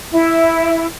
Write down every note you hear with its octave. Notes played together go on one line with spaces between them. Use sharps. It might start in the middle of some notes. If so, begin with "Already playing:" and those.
E4